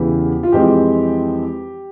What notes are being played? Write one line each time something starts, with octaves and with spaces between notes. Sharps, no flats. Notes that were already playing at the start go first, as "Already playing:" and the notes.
Already playing: E2 C#3 E3 G4
F4
F2 E3 G#3 C4 G4